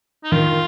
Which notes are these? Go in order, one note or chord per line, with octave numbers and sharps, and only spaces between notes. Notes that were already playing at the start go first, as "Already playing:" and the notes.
D#4
D#3 F4